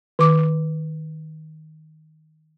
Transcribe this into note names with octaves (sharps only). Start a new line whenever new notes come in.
D#3 D6